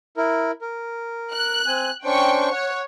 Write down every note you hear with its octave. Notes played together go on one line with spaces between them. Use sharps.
E4 A#4
A#4
F#6
C4 G#5
C#4 D4 C5 G5 C#6
C#5 F#5